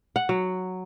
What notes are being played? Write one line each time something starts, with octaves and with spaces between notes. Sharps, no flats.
F#5
F#3